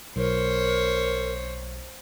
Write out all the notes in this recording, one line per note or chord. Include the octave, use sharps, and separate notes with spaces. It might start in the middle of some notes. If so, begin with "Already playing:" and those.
B1 A#4 C5 C#5